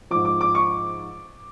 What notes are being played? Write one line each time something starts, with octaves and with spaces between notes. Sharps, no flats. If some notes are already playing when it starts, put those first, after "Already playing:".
G#2 F3 D6
D6
D6
C#6